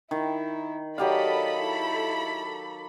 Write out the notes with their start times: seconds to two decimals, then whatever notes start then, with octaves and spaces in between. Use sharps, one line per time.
0.11 D#3 E4
0.98 F#3 G4 A4 D5 D#5 F5 B5
1.57 E4